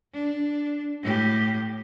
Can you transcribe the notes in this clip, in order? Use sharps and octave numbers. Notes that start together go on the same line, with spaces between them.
D4
A2 G4